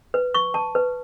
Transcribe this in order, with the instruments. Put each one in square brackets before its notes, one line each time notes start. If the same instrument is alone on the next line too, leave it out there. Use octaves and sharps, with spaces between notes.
[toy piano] B4
C#6
A5
B4